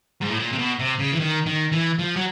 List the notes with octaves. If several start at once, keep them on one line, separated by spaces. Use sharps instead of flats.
G#2
A2
A#2
C3
B2
C3
C#3
E3
D#3
D#3
E3
F3
F#3